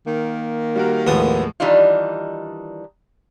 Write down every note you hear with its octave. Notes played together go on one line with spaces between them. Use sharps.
D#3 A#3
G3 F#4 A#4
D#2 A2 F3 G#3 B3 D#6
D#3 E3 G3 D4 D#4 F4